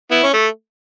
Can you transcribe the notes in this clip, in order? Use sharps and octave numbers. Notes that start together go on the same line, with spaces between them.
B3 E4
C#4
A3